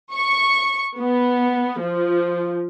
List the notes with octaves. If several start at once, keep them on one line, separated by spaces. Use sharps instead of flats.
C#6
B3
F3